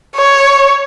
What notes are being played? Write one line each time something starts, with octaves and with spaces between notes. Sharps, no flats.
C#5